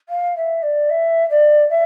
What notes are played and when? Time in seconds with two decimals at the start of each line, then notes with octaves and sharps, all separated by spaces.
0.09 F5
0.36 E5
0.62 D5
0.90 E5
1.30 D5
1.70 E5